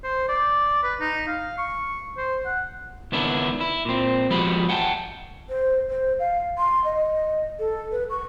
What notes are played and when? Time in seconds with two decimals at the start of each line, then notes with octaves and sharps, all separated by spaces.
0.04 C5
0.29 D5
0.83 B4
1.00 D#4
1.27 F5
1.58 C#6
2.17 C5
2.46 F#5
3.12 C#2 D#3 B3 D4 E4
3.61 E4
3.85 A#2 C4
4.30 F3 G#3 B3 F#4 G4 B5
4.69 F#5 G5 A5
5.49 C5
5.89 C5
6.19 F5
6.58 C6
6.84 D#5
7.59 A4
7.92 B4
8.10 C#6